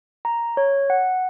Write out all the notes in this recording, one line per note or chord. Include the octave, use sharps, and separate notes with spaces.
A#5
C#5
F#5